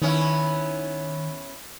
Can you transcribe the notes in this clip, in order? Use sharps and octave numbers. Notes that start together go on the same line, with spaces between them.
D#3 B3 C#4 E4